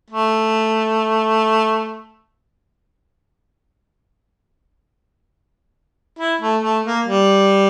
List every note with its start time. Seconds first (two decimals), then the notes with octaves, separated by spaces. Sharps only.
0.10 A3
6.19 E4
6.41 A3
6.63 A3
6.85 A#3
7.06 G3